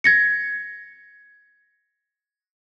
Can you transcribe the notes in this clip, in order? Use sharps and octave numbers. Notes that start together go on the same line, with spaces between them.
G#6 A#6 C#7